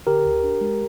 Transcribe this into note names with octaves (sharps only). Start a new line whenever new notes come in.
D3 G4 A#4
D2
D4
G#3